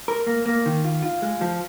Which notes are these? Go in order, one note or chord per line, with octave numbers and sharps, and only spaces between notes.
A#4
A#3
A#3
D#3
F4
F4
G#3
F3